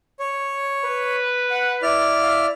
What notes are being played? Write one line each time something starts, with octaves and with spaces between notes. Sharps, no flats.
C#5
B4
F#5
E4 D5 F6
F5